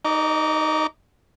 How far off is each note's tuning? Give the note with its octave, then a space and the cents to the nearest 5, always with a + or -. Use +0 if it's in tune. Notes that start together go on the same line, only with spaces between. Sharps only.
D#4 +0 D#5 -45 D6 -30